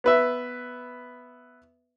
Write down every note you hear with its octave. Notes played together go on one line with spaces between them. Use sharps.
B3 B4 E5